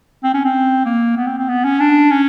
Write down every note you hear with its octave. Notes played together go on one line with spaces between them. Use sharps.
C4
C#4
C4
A#3
B3
C4
C4
B3
C#4
D4
C#4